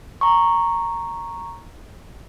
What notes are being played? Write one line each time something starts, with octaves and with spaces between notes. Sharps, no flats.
A#5 C#6